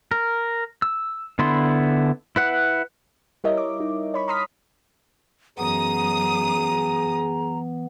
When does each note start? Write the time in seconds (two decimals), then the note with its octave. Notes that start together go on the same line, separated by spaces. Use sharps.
0.11 A#4
0.82 E6
1.39 D3 B3 E4 C6
2.36 E4 B4 F#5
3.44 G3 E4 A#4 C#5 D#5 E5
3.57 D6
3.80 D#4
4.14 C#5 B5 C#6
4.28 A#5 C6 D#6 F6 B6
5.58 F#2 E3 B3 G#4 A#5 D#6